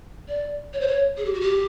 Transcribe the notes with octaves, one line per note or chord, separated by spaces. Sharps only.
D5
C#5
C5
C#5
G#4
G4
F#4
G4